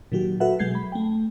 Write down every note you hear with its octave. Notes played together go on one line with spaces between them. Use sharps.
A#2 D#3 F#3 F#4 G4
F#4 A4 B4 E5 F#5
B2 F#3 G#3 G6 G#6 C7
B5
A3 G5